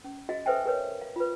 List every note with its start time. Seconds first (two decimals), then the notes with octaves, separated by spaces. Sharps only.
0.04 C#4
0.29 F#4 G#4 D#5 F5
0.46 A4 B4 C5 E5 G5 G#5
0.66 G#4 A#4 B4 C#5
1.01 F5
1.16 F4 B4